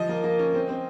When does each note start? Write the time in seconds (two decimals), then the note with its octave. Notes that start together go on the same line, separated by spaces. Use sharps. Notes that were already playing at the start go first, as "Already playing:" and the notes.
Already playing: F3 D#5
0.09 A#3
0.24 A#3
0.39 C#4
0.54 C4
0.69 C4